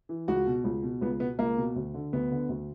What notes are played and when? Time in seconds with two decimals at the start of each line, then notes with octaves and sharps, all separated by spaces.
0.09 E3
0.28 C#2 F#4
0.47 B2
0.64 C#2
0.83 B2
1.01 C#2 B3
1.20 B2 B3
1.39 C#2 A#3
1.57 B2
1.76 D2
1.94 D3
2.13 D2 B3
2.31 D3
2.49 D2